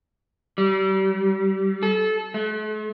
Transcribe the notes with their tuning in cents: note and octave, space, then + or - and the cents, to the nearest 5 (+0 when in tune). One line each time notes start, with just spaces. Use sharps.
G3 -35
A4 -25
A3 -45